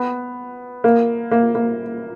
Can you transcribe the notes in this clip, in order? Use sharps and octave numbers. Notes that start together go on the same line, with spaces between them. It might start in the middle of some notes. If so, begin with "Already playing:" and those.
Already playing: B3
A#3
A#3
A#3